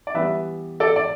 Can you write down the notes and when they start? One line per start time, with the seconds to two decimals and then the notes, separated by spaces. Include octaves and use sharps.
0.07 D5
0.14 E3 G3 B3 B4 E5
0.80 A4 D5
0.96 D5